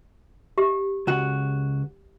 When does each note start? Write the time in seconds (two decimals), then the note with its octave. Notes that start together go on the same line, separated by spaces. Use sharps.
0.58 G4
1.07 C#2 F#4